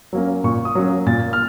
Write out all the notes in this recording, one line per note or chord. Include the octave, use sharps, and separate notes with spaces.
F#3 A#3 C#4
A#2 C#6
D#6
F#3 A#3 C#4
A#2 A6
F6